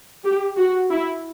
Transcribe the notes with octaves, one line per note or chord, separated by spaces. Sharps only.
G4
F#4
E4